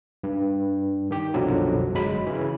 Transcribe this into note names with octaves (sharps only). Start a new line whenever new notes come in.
G2
D#3 G4
C2 F#2 B2 D3 F3 F#3
G1 F#3 G#3 B5
C#3 E3